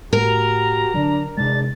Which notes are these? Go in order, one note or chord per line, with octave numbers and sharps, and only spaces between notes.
A2 F#4 G4 A#4 A#5
D3 F#3 D4
E2 C3 D#3 G#3 D4 A6